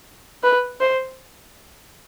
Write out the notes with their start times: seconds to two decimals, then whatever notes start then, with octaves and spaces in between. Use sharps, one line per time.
0.44 B4
0.81 C5